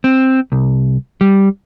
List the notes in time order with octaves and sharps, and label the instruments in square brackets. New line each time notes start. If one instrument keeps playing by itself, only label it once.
[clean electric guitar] C4
C2
G3